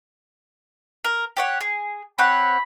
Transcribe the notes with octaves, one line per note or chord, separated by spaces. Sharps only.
A#4
G4 C#5 F#5
G#4
C4 C#5 F#5 B5